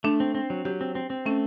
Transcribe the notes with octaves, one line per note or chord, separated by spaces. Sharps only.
A3 D4
C4
C4
F#3
F#3 G4
C4
C4
C4
A3 C#4